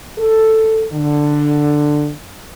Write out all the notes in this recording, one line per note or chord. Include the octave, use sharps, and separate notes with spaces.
A4
D3